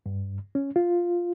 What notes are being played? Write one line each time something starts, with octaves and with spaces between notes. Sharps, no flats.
G2
C#4
F4